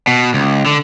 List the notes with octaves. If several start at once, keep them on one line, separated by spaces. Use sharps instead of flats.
B2
C#2
D3